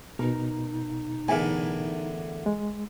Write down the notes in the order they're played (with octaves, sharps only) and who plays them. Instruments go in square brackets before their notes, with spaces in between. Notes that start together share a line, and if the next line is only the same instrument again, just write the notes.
[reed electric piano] B2 [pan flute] D#4 [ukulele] A#4
[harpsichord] E2 A2 D3 [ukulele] A#4 E5 G#5
[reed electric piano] G#3